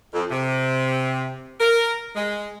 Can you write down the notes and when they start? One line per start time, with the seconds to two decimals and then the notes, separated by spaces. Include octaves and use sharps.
0.14 F2
0.31 C3
1.61 A#4
2.16 G#3